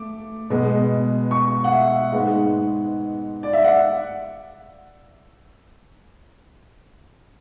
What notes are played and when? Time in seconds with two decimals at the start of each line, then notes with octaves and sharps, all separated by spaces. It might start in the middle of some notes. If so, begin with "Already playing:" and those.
Already playing: A3 D6
0.50 B2 G#3 B3
1.31 C#6
1.64 F#5
1.72 E5
2.12 G#2 G#3 B3 F#5
3.43 D5
3.53 E5
3.64 F#5